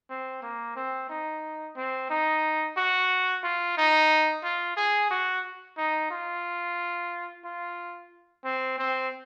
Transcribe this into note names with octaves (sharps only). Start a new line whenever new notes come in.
C4
A#3
C4
D#4
C4
D#4
F#4
F4
D#4
F4
G#4
F#4
D#4
F4
F4
C4
C4